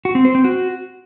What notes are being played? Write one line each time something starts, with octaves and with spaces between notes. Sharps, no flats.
F#4
C4
C5
C4
F#4